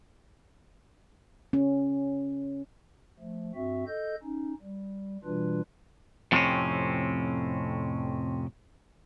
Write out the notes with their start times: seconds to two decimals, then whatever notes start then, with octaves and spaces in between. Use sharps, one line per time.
1.53 C#4
3.19 F3 A3
3.55 G2 C4 F#4 E5
3.87 A4 D#5 G6
4.23 C#4 D#4
4.63 G3
5.24 B2 E3 G3 D4 F4 B4
6.32 F2 A2 C3 A3 C4 C#4